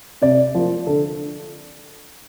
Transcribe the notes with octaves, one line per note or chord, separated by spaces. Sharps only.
C3 D5
F3 A#3
D3 A4